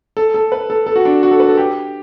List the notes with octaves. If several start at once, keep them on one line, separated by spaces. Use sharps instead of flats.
A4
A4
B4
A4
A4
F#4
D4
F#4
A4
B4
A4
G4